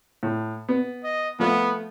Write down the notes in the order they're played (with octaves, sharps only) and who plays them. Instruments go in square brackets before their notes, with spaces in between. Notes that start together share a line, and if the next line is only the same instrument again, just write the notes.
[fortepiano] A2
B3
[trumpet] D#5
[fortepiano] F3 A3 F4 [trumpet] B3